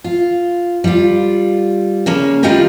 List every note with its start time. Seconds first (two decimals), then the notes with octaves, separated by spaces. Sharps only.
0.04 F4
0.84 G3 F4
2.06 C#3 A#3 C#4
2.43 D#3 G3 D#4 F4 G4 A#4